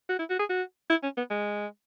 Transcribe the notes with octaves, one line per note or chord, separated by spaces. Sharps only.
F#4
E4
F#4
G#4
F#4
E4
C#4
B3
G#3